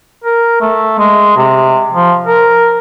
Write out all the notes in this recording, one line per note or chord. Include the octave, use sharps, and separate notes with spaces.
A#4
A3
G#3
C3
F3
A#4